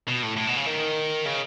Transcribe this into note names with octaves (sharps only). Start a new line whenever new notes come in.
B2
A2
A2
B2
C#3
D#3
C#3